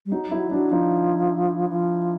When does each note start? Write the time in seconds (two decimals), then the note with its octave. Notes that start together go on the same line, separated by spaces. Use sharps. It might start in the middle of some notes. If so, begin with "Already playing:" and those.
0.06 G3
0.12 F#3 D#4
0.31 F#3 E4
0.51 F#3 D4
0.71 F3 D#4
1.70 F3